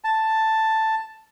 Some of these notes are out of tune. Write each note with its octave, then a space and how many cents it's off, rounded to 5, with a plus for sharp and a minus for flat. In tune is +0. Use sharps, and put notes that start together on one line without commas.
A5 +5